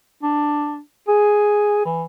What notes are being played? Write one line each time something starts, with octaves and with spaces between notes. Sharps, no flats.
D4
G#4
E3